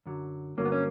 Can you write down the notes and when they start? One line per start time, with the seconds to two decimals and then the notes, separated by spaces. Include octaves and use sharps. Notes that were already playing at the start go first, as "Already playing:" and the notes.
0.06 F#2 D3 F#3
0.57 G2 D3 F#3 A#3 C#4
0.65 B3
0.72 C#4